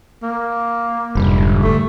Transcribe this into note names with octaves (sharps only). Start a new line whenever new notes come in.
A#3
F1 G#2 D3 G3
A3